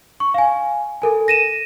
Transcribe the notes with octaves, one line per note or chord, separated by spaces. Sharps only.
C#6
F5 G#5
A4 A#4 G#5
A#6 D#7 E7